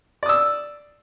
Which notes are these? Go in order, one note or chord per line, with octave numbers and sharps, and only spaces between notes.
D5 D#6 E6